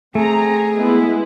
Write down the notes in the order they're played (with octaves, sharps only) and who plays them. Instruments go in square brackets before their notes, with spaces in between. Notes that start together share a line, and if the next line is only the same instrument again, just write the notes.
[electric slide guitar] A3 [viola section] C4 A#5 [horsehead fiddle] G#4
[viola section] G#3 B3 E4